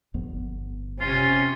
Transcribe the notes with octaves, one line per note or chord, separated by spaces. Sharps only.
G1 F2 B3
C3 C#4 F4